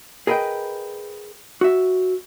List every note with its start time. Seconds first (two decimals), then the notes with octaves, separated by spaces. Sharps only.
0.27 G#4 A#4 B4 D#5 G5
1.61 F#4 E5